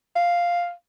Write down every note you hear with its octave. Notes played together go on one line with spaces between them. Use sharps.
F5